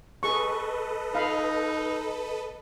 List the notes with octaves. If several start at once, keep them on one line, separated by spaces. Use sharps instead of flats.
G#4 A4 B4 D#5 C#6
D#4 F5 B5